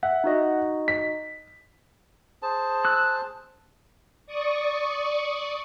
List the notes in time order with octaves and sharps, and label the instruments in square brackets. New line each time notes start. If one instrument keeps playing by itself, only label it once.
[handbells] E5 [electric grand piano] F#5
[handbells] D#4 F#4 D#5
[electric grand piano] B6
[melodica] G#4 C5 A5
[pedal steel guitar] E6 F#6
[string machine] D5 C#6 D#6